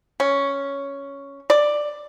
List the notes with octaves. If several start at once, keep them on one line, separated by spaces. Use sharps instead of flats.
C#4
D5